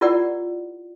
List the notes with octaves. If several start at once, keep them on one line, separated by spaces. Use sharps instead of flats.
E4 F4 G4 A#4 D5 F#5